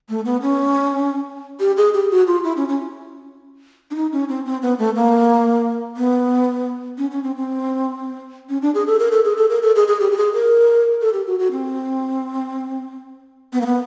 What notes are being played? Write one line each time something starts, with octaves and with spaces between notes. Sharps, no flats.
A3
B3
C#4
G4
G#4
G4
F#4
F4
E4
C#4
C#4
D4
D#4
C#4
C4
C4
B3
A3
A#3
B3
C#4
C#4
C4
C4
C#4
D4
G#4
A4
A#4
A4
G#4
A4
A#4
A4
G#4
G#4
G4
G4
G#4
A#4
A4
G4
F#4
F#4
C4
B3
A#3
B3